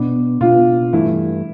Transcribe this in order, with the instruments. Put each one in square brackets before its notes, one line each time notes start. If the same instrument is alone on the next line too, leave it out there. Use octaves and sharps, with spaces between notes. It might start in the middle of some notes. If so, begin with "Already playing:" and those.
Already playing: [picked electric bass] B2 B3 D4
[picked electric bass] B2 B3 D4 [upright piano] F4
[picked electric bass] G2 E3 A3 [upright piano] E4